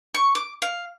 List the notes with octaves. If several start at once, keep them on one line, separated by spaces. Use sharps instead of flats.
C#6
D6
F5